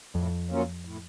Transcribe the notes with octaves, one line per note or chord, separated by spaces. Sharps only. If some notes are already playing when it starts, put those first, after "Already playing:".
F2 A2
F#3 A#3 C#4 F4
A2